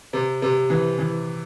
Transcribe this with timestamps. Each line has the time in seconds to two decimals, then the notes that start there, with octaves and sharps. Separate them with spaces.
0.13 C3
0.42 C3
0.70 E3
0.98 E3